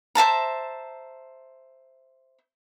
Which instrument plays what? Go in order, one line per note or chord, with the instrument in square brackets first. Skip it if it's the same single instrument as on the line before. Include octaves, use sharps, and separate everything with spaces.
[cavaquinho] C5 E5 A5 A#5